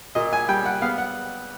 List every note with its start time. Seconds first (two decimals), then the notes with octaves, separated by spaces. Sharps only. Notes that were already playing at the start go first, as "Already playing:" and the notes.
0.15 A#2 D#5
0.33 G#5
0.49 G3 G5
0.65 F#5
0.82 B3 F5
0.98 F#5